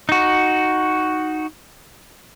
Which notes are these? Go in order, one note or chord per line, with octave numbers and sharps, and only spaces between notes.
D#4 F#4